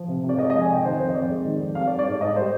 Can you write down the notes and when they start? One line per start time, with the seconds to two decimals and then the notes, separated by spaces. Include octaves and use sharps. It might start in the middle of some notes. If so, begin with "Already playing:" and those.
Already playing: F3
0.08 C3
0.23 C3
0.29 D5
0.38 G#3 D#5
0.50 D#5
0.54 F3
0.61 G#5
0.69 C3 G5
0.84 D#3 C5
0.99 F2 C5
1.09 D#5
1.15 F2 D5
1.30 G#3
1.45 D#3
1.60 F2
1.75 G3 F5
1.87 D5
1.90 G3
1.99 D5
2.06 G#2
2.21 G#2 D#5
2.36 G3 C5